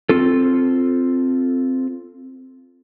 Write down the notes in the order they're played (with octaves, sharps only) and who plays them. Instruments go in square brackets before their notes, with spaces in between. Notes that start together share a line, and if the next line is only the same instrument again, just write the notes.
[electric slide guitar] C4 F4 A4